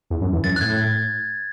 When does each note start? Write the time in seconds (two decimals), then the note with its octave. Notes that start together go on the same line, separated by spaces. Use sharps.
0.10 E2
0.21 F#2
0.33 E2
0.44 F#2 A6
0.56 F#6
0.61 A2 G#6